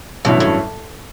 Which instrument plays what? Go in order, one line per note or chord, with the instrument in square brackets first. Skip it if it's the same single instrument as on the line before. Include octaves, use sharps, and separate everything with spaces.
[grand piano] A1 G2 F#3 C#4 E4 [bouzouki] B2
[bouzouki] A2